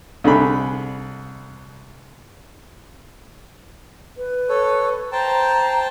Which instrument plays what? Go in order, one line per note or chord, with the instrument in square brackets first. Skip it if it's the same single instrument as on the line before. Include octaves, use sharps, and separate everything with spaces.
[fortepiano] C2 D3 G#4 B5
[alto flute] B4
[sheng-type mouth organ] A4 C#5
[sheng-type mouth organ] C5 G5 A5 [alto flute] A#5